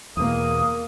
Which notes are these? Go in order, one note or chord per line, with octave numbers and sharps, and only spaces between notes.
E2 B2 A#3 D#6